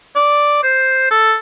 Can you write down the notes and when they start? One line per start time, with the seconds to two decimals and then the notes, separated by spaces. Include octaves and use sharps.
0.16 D5
0.63 C5
1.11 A4